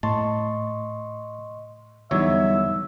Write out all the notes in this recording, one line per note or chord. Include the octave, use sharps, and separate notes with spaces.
A2 D#5 A5 C6 C#6
E2 D3 F#3 G3 D#4 C#5 E5